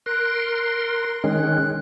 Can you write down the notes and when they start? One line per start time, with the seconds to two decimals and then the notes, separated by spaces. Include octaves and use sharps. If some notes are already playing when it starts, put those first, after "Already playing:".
0.06 A#4 C6 F#6
1.24 D#3 G#3 C#4